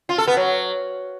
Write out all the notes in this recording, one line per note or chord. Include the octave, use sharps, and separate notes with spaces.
F4
A4
B3
F#3